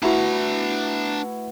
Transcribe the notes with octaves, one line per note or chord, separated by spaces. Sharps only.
A3 D4 E4 F#4 B4 F#5 A#5